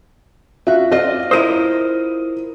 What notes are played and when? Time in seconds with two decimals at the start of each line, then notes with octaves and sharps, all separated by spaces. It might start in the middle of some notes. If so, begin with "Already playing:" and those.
0.67 F4 F#4 E5
0.91 C4 F4 D5 D#5
1.31 E4 A#4 C5 D#6 D#7